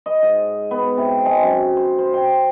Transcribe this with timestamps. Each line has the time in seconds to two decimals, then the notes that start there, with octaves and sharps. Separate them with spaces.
0.06 D#5
0.23 G#2
0.71 B3
0.97 C3
1.25 G#3
1.42 F#2
1.77 C5
1.98 C5
2.13 G5